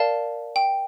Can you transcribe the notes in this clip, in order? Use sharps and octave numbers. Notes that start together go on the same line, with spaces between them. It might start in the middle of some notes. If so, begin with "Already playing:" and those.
Already playing: A#4 D5 F5 A5
G5